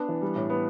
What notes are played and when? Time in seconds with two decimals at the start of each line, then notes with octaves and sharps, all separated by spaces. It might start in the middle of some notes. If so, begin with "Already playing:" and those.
Already playing: B3 D4
0.09 E3
0.22 G3
0.36 A2
0.50 B3